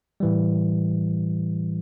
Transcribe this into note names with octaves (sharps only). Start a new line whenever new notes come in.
A2 E3 G3